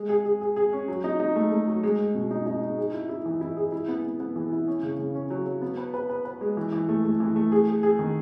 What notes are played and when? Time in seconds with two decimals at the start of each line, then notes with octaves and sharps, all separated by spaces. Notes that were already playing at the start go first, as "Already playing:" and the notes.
Already playing: G#3
0.09 G#4
0.25 G#4
0.41 G#4
0.56 G#4
0.73 C#4
0.88 F#3
1.04 D#4
1.20 D#4
1.36 A3
1.52 A3
1.67 F#3
1.83 G#3
1.99 G#3
2.14 B2
2.31 D#4
2.46 D#4
2.62 D#4
2.78 G#4
2.94 E4
3.09 E4
3.26 E3
3.41 E4
3.56 G#4
3.72 E4
3.88 B3
4.04 B3
4.20 B3
4.36 E3
4.51 E4
4.67 C#4
4.83 C#3
4.99 C#3
5.15 C#4
5.30 F#3
5.46 F#3
5.61 B3
5.77 B4
5.94 B4
6.10 B4
6.25 B4
6.41 G#3
6.57 E3
6.72 E3
6.89 A3
7.04 A3
7.20 E3
7.36 A3
7.52 G#4
7.67 G#4
7.83 G#4
7.99 D#3